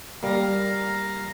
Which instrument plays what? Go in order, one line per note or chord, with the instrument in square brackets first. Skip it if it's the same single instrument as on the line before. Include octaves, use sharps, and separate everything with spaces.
[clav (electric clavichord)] G3 A#3 [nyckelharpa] F5 A#5